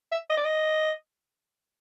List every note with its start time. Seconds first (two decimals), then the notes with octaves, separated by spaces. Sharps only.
0.12 E5
0.30 D#5
0.37 D5
0.45 D#5